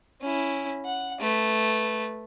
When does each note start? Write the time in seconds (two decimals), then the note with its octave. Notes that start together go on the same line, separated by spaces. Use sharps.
0.21 C#4 E4
0.85 F#5
1.21 A3 B4